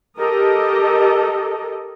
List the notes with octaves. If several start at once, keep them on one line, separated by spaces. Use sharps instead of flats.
G4 A4 A#4 D#5